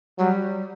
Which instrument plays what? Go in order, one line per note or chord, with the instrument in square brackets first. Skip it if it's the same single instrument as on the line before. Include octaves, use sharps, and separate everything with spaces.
[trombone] F#3 [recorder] G3